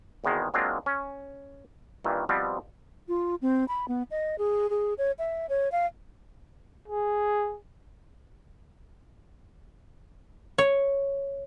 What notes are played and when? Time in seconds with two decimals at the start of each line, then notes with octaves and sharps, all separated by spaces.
0.24 G#1 E2 B2 D#3 G#3
0.54 F#3 G#3 A#3 C4 D4 F4
0.86 C#4
2.04 G2 A#2 D#3 E3
2.29 B2 F3 G3 B3 C4
3.08 F4
3.42 C4
3.68 B5
3.88 B3
4.11 D#5
4.38 G#4
4.70 G#4
4.98 C#5
5.19 E5
5.49 C#5
5.72 F5
6.88 G#4
10.58 C#5